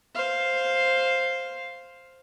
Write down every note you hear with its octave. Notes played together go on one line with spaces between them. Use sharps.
C5 F5